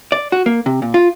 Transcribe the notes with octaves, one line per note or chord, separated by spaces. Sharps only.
D5
F#4
A#3
C3
A#2
F4